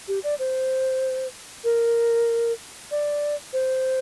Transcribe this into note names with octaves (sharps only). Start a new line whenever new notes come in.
G4
D5
C5
A#4
D5
C5